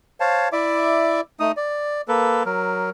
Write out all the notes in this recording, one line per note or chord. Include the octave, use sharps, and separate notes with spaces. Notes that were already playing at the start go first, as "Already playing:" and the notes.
C5 C#5 F5 A5
E4 D5 E5 D6
A3 D#4 D#6
D5
A#3 A4 B4
F#3 A#4